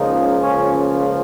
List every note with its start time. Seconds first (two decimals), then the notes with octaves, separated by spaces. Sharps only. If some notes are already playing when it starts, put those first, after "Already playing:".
Already playing: C#2 C#3 F3 A#3 D#4
0.40 C#4